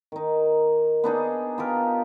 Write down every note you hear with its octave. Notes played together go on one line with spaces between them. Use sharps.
D#3 D#4
B3 D4 D#4 G#4
B3 F4 G4 A#4